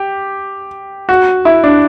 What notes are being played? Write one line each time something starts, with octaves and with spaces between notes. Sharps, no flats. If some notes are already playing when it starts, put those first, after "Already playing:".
Already playing: G4
F#4
E4
D4